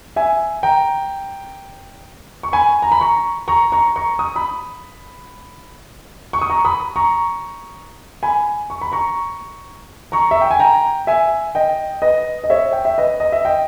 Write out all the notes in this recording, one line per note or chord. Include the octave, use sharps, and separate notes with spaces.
E5 G#5
G5 A#5
C#6
G#5 B5
A#5
B5
A#5 C#6
A#5 C#6
A#5 C#6
A#5 C#6
D#6
B5 D#6
C#6
D#6
A#5 C#6
B5 D#6
A#5 C#6
G#5 B5
C#6
B5
A#5 C#6
A#5 C#6
E5
G5
G#5
G5 A#5
E5 G#5
D#5 G5
B4 D#5
D#5
C#5 E5
G5
E5
B4 D#5
D#5
E5
D#5 G5